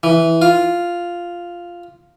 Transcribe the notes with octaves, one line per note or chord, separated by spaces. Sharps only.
E3
F4